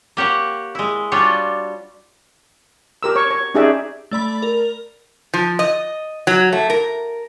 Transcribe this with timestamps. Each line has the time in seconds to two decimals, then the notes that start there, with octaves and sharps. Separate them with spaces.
0.17 A#3 G4 C#5 F#5
0.75 G#3 E4
1.12 G3 D4 F4 F#4 C#5
3.03 G4 A#4 E6
3.16 C#5 C#6
3.31 C#5
3.55 C#4 D#4 G4 G#4 D5 E5
4.11 A3 D5 B5
4.42 A#4
5.34 F3
5.59 D#5
6.27 F#3
6.53 A3
6.70 A#4